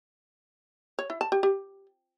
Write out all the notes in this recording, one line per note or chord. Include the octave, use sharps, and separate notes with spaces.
C#5
E4
A5
G4
G4